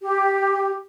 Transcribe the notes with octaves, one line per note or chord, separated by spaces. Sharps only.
G4